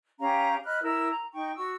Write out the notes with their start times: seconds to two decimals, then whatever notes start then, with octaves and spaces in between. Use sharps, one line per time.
0.20 C#4 G4 F5 A#5
0.65 D#5 B5 F6 F#6
0.82 E4 A#4 E6
1.11 A#5
1.33 D#4 G5 C#6
1.56 F#4 C#6 E6